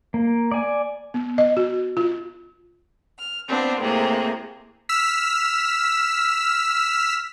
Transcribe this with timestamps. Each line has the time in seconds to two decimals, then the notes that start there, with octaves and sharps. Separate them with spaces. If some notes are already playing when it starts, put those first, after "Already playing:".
0.14 A#3
0.51 D5 G#5
1.14 B3
1.38 D#5
1.57 F#4
1.97 F4
3.18 F6
3.48 B3 C4 D4 F4
3.80 A2 C3 A#3 G#4
4.89 E6 F6 B6